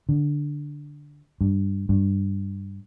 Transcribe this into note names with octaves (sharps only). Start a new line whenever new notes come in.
D3
G2
G2